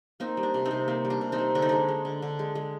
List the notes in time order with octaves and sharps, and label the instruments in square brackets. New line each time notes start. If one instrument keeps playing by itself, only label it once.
[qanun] A#3 C4 D#4
G3
D4
C3
C4 D#4
C3
A#3 C4
G3
D4
C3
C4 D#4
C3
D3 D4
D#4
G#3 D4
G#3
D3
D3
G#3
G#3